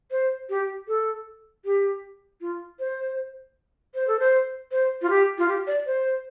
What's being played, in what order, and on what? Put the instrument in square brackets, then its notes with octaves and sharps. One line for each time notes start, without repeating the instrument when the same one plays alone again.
[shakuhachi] C5
G4
A4
G4
F4
C5
C5
A4
C5
C5
F4
G4
F4
G4
D5
C5